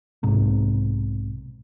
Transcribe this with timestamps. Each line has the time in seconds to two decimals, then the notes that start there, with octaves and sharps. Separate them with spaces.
0.23 B1 G#2 C3